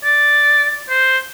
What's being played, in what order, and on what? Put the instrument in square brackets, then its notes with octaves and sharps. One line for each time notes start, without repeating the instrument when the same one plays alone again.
[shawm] D5
C5